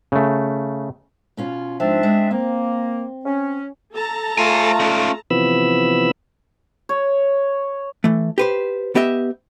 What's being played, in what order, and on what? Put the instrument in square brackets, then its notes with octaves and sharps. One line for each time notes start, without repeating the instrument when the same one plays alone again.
[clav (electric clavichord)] C#3 A3
[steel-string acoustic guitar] B2 C#4 F4
[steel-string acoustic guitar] G#2 F3 [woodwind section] C4 D4 E5
[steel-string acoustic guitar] G#3
[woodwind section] A#3 [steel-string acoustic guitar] C4
[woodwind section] C#4
[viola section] A4 A5 A#5
[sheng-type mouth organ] A3 F4 [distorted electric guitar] C5 G#5
[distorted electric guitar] C#4 D#4
[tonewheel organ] C3 E3 F3 B3 B5 E6
[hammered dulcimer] C#5
[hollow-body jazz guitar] E3 A3
G4 B4 C5
B3 G4 D#5 E5